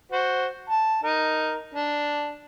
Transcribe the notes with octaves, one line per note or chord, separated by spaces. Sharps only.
F#4 C5
A5
D#4 A#4
D4